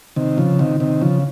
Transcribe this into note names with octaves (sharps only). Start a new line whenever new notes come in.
C3 D#3
C#3 F3
C3 D#3
C3 D#3
C#3 F3